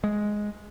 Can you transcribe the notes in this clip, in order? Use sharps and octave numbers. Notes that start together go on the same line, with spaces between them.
G#3